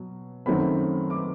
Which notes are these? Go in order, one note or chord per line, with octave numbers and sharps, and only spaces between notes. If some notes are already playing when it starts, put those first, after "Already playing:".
Already playing: B2 F#3
F#2 D#3 F#3 A3 C4 B5
D6